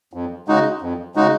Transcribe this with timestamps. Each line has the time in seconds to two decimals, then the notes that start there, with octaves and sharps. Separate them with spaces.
0.13 F2
0.48 C#3 G#3 D#4 F#4
0.81 F2
1.15 C#3 G#3 D#4 F#4